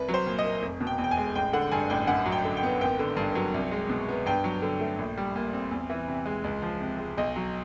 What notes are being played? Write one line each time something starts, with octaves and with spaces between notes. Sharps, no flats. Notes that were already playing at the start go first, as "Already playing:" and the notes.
Already playing: C2 B4
F#3
C5
A#2
D#5
A#3
F1
B2
G5
E2
G5
G#5
G#3
A1 G5
D3 F#5
G2 G#5
A1 G5
F#2 F#5
F#3
G5
D3
G5
B3
G#1 G5
D3
G2
F#3
C2
G#3
B2
B3
G2 G5
F#3
D3
A3
A#1
G3
A#2
C4
E2
E3
C3
G#3
C#2
F3
C3
G#3
B1 D#5
F#3